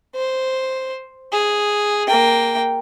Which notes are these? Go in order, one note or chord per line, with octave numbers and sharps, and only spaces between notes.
C5
G#4
A#3 G5